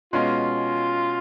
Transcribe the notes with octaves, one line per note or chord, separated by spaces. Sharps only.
B2 G#3 C#4 F4